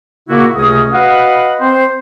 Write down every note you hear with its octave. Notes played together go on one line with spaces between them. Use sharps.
A#2 C#3 A#3 E4 F#4
C#2 C3 A3 C#4 D#5 D#6
F#4 B4 D#5 F5 F#5 B5
C4 C5